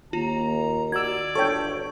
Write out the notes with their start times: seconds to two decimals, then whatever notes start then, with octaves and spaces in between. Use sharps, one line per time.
0.13 D#2 F4 A#5
0.92 F#4 D5 E6 G#6
1.35 G1 D2 A4 C#5 G5 C#6